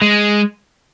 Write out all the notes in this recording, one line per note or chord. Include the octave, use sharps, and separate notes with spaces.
G#3